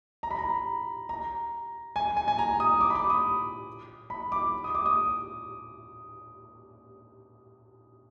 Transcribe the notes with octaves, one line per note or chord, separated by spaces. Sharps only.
A#5
B5
A#5
A#5
G#5
G#5
G#5
A#5
D#6
D6
B5
D6
D#6
B5
D6
D#6
D6
D#6